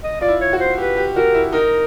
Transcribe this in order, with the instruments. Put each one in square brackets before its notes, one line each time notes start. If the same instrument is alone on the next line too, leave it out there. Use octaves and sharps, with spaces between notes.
[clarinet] D#5
[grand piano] F4 [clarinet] D5
[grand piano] E4
[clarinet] C#5
[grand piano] F#4
[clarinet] C5
[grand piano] G4 [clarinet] B4
[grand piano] G4
[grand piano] F#4 [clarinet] A#4
[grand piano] E4
[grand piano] D#4 [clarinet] A#4